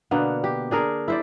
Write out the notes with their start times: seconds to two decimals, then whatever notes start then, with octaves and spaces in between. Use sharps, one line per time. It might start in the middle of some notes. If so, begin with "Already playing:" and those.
0.11 B2 D3 A#3 B3
0.44 G4
0.71 D4 G#4 A#4
1.08 E4 C5 D5